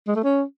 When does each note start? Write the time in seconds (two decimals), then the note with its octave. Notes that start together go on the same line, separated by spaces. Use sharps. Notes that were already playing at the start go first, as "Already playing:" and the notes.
0.07 G#3
0.16 A3
0.24 C#4